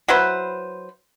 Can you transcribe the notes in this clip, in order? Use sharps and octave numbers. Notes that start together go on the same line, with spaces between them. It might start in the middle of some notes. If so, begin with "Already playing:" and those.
F#3 E4 B4 C5